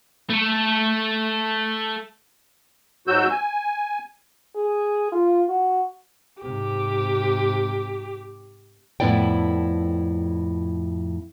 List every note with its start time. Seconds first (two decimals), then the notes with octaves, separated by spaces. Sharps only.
0.30 A3 A4
3.07 G#2 F#3 F#4 E6 G6
3.30 G#5
4.56 G#4
5.12 F4
5.49 F#4
6.42 G#2 C3 G4
9.00 F2 A2 B3 E4 D5 G5